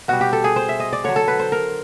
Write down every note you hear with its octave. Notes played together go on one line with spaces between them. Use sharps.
B2 G3 F#4
G4
A4
G#4
C5
E5
D#5
D5
D3 F#3 C#5
A4
B4
C5
A#4